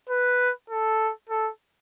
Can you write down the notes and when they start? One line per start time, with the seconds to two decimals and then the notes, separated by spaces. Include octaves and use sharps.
0.10 B4
0.70 A4
1.30 A4